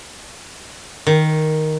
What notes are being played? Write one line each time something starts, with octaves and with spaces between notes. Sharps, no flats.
D#3